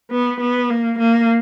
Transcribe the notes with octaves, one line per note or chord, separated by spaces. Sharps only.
B3
B3
A#3
A#3